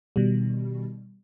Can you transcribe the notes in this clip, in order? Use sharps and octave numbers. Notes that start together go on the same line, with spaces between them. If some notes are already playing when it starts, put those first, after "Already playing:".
B2 D#3 G3